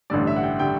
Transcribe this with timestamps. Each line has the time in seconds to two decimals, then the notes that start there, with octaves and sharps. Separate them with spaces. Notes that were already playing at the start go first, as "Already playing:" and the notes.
0.10 A1 G2 D3 G3 D5
0.27 E5
0.36 F#5
0.43 G5
0.59 D3 G3 G5